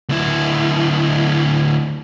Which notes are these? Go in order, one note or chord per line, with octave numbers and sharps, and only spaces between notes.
D2 E4